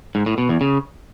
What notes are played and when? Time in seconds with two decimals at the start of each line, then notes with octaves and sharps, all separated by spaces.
0.15 G#2
0.26 A2
0.38 B2
0.49 E2
0.61 C#3